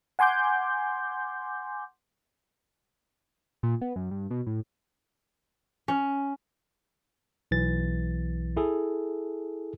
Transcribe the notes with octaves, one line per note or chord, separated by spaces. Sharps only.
F#5 G#5 C6 D6 G6
A#2
B3
F#2
G2
B2
A2
C#4
B1 E3 A6
E4 G#4 A4